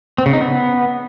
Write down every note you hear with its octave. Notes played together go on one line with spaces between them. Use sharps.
C4
C#3
D#4
B3